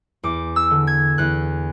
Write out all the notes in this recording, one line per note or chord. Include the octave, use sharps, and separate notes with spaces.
E2 D6
E6
D3
G#6
E2 F#6